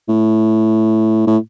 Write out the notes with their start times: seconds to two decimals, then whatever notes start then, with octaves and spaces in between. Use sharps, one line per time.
0.09 A2
1.27 A2